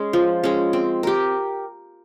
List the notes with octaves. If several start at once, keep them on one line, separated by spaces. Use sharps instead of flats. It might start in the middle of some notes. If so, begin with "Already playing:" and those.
Already playing: G#3 C#4
F3
G#3 C#4
C4
G4 A#4